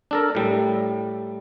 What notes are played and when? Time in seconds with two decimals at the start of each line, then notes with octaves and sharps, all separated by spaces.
0.11 D4 A4 A#4
0.35 A2 G3